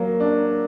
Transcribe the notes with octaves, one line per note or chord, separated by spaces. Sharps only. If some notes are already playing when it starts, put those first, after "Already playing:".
Already playing: F#3 A#3
D4